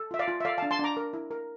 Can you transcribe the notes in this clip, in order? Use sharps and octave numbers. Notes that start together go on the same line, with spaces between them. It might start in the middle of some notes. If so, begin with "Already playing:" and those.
Already playing: A4
F4 E5
D5 F5
F4
E5
A4 D5 F5
D4 F5 A5
A5 C6
D4 A#5 D6
A#4
E4
A#4